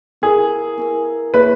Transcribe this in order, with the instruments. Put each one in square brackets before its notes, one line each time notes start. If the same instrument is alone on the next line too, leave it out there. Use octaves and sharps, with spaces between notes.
[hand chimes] B3 E4 A#4 [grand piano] G#4
[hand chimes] B3 E4 A#4
[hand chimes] A#3 E4 G#4 C#5 E5 [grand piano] B4